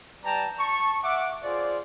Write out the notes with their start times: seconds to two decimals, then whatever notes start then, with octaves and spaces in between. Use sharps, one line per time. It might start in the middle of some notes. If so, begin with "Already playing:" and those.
0.25 G3 B4 D5 G5 A5 A#5
0.59 A5 C#6
1.03 E5 F#5 D6
1.44 F4 G#4 C5 D5